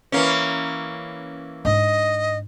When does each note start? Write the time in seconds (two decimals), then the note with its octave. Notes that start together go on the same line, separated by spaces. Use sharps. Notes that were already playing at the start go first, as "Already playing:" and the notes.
0.12 E3 A#3 C#4
1.65 G#2 D4 D#5